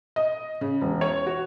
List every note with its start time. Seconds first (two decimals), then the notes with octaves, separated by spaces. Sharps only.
0.16 D#5
0.61 C#3
0.81 E1
1.01 C#5
1.27 F#4